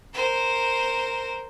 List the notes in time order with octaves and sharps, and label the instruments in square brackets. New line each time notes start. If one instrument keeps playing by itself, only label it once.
[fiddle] A#4 C5